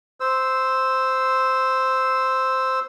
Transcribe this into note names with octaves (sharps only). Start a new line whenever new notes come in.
C5 E6